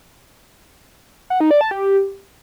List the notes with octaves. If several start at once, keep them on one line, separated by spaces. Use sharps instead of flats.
F#5
D#4
D5
A5
G4